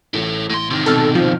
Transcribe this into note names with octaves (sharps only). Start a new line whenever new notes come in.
A1 E3 E4 A4
A2 C6
C3 D#3
B2 C4 A4 F6
F3